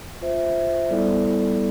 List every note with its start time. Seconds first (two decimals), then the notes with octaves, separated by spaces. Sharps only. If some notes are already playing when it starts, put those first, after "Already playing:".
0.21 F4 C5 E5
0.89 G3 B3 E4 A4 D5